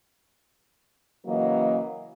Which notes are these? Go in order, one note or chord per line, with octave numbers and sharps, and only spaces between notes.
C#3 E3 F#3 A#3 D#5